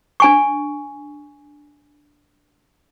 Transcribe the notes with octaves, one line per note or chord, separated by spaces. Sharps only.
D4 G#5 C#6